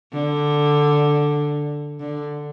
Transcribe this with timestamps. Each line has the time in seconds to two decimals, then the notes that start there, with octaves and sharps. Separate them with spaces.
0.13 D3
2.00 D3